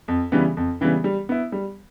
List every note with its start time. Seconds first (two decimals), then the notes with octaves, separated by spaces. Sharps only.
0.08 F2
0.32 C#3 E3 G3 B3
0.57 F2
0.81 C#3 E3 G3 B3
1.04 G3
1.29 B3 E4
1.52 G3